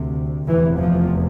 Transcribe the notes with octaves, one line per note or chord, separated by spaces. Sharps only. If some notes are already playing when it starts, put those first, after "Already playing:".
Already playing: D2 C3
F1 E2 C3 E3
F3